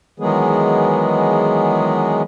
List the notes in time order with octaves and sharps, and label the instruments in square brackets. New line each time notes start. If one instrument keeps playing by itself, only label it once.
[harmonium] D#3 E3 F#3 G#3 B3 G#4